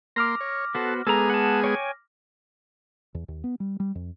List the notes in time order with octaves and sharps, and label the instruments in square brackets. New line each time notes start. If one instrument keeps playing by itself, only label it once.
[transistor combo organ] A#3 C6 [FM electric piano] D6 F6 A#6
[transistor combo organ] C#5
[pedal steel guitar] B3 F#4 C5 [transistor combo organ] A4
[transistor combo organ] G#3 B3 G#4 [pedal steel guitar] A4 A#5
[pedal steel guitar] F#5 A5
C#5 G5 G#5
[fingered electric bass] E2
D#2
B3
G3
G3
F2